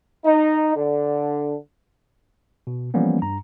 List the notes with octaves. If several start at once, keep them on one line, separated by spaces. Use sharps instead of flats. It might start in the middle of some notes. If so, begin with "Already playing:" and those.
D#4
D3
B2
E3 F3 G3 A#3 B3 C#4
G2 A#5